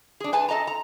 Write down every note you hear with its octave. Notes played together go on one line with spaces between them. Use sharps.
D4 G#4
B4 G#5 A5
A4 D#5 A5 A#5
A#5